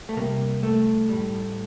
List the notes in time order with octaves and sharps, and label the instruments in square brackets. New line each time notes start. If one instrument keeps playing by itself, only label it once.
[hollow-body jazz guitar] A3
C2 C3 G3 A#3
A3
A2 G3